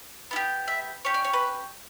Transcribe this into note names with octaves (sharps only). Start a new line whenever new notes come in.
B3 E4
G4
E5
C#4 G4 C#5
D5
C#5
B4